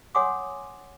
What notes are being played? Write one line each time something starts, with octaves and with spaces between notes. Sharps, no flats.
C#5 F#5 G#5 C6 D6 D#6